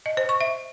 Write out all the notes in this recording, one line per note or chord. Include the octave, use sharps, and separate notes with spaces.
D#5
C5
C#6
E5